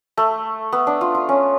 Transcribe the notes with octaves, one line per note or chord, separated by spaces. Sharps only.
A3
B3
D4
F4
F4
C#4